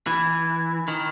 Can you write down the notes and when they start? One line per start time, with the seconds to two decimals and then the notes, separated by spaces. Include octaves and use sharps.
0.07 E3
0.88 D#3